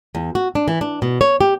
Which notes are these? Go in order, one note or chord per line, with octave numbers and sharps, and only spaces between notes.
E2
F#4
D4
E3
D4
B2
C#5
G4